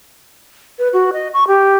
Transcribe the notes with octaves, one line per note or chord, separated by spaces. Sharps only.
B4
F#4
D#5
C#6
G4